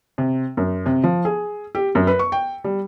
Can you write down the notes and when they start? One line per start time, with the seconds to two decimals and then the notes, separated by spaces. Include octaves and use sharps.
0.18 C3
0.57 F#2
0.86 C3
1.03 F3
1.25 G#4
1.75 G4
1.95 F#2
2.07 B4
2.19 C#6
2.32 G5
2.64 G3